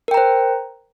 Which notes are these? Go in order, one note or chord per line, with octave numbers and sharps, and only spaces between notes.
A#4 C5 G5 A#5